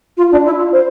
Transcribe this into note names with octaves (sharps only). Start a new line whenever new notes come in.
F4
D4
E4
F4
C5